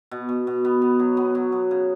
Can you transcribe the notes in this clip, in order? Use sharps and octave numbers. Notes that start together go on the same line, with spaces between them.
B2
B2
B2
B3
B3
F#3
B3
F#3
F#3
C#3